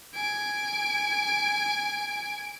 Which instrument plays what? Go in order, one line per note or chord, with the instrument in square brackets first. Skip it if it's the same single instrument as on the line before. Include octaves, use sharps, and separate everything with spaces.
[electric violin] G#5 D7